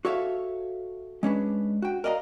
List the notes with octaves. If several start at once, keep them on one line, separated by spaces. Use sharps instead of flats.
F#4 A4 C#5 E5 F5
G#3 C#4 D4 B4
F#4 G5
A#4 D5 D#5 F5 A#5